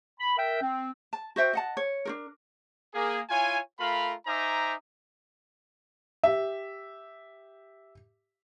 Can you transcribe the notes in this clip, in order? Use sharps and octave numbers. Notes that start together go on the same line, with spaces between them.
B5
A#4 E5 G5
C4
A5
F#4 C5 E5 G5
D#5 F#5 A5
C#5
D4 F#4 A#4
A#3 G#4
E4 F4 C#5 G#5
A3 F4 A#4 F5 B5
D#4 C5 E5 G#5 A#5 D6
G4 E5